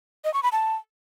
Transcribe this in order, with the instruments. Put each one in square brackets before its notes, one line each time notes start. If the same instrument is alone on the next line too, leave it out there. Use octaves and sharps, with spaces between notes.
[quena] D#5
C#6
B5
A5